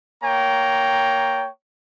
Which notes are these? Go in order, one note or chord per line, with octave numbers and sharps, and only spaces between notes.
A#3 C#5 G5 A#5